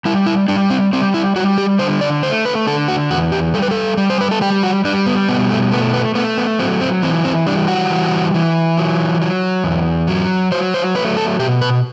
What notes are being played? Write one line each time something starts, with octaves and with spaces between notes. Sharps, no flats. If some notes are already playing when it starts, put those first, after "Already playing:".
G3 E4
E4
G3 D4
C4
G3 C4
E4
G3 F#4
G4
D3 C5
D5
A3 C5
B4
D3 A4
F#4
E2 F#4
G4
G3 A4
B4
A4
G3
C5
B4
A4
G3 G4
F#4
G3 D4
B3
B2 B3
A3
A3 B3
B3
A3 B3
B3
F#3 C4
C4
E3 C4
C4
G3 D4
F#4
E3
E3
F#3
F#3
E2
F#3
F#3 C5
C5
A3 B4
A4
B2 G4
B4